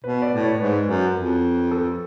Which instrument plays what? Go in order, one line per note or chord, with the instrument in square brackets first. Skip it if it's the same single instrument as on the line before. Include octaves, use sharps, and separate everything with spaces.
[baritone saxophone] B2 [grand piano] B4
[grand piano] D5
[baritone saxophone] A2
[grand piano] C#5
[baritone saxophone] G#2 [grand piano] B4
[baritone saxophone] F#2
F2
[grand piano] A4